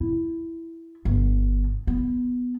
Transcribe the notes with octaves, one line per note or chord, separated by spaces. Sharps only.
E4
G1
B3